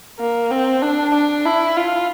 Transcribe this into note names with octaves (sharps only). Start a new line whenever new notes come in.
A#3
C4
D4
D4
E4
F4